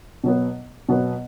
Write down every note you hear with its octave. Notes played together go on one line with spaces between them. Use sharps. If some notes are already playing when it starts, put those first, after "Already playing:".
B2 F#3 B3
B2 F#3 B3